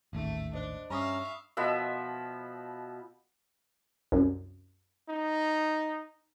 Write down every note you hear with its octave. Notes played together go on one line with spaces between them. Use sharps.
A1 D#2 G#2 A3
D4 C5 D#5
G2 C#4 E5 F5 A#5 B5 C#6 D#6
B2 F3 B4 E5
C2 F#2
D#4